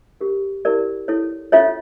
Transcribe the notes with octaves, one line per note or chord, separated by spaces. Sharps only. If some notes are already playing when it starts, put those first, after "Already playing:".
C#4 G4 A#4
E4 G4 A#4 D5
E4 A4 C#5
C#4 F4 A4 C#5 E5